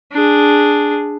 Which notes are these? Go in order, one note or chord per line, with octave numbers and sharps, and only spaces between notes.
D4 G#4